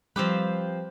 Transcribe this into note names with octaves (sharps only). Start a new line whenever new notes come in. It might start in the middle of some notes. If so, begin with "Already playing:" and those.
F3 G3 C4 G4 B4